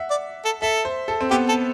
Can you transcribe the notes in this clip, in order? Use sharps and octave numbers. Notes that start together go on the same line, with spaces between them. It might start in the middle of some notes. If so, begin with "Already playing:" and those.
Already playing: E5 F#5
D5
A4
A4 E5
C5
A4
C4
B3 G4
A4